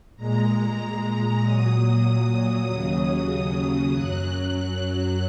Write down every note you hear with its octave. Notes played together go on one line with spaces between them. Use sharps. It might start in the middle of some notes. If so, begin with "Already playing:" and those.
A#2 G#3 A#5
A#2 F#3 D#6
D#2 C#3 F#3 D#6
F#2 F#3 F#6